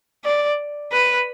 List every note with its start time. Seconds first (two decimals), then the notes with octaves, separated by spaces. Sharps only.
0.25 D5
0.92 B4